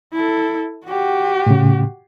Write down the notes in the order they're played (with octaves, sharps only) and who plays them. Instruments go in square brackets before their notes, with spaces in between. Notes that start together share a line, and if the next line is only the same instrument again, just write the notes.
[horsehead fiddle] E4 A4
F#4 G4
[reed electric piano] A2 C#3